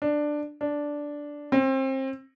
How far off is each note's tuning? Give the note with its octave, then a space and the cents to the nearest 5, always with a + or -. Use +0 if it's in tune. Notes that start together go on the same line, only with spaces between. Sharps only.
D4 +10
D4 -5
C4 +30